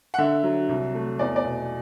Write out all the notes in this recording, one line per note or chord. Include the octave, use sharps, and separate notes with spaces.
F#5
D3 E5
F#3
C2
A3
E2 D5
D5
B2